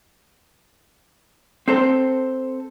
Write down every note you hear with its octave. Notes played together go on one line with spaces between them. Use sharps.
C4 A4 C5